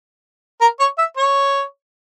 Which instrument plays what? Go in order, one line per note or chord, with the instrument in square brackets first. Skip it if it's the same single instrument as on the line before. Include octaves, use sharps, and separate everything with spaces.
[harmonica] A#4
C#5
E5
C#5